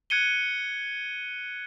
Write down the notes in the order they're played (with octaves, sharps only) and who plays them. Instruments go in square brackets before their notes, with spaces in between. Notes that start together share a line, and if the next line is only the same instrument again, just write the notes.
[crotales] F#6 G#6 C#7 D#7 G7